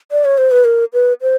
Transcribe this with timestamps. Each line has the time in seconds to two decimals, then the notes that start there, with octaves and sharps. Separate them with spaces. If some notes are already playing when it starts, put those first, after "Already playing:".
0.11 D5
0.25 C#5
0.38 C5
0.51 B4
0.65 A#4
0.93 B4
1.22 C5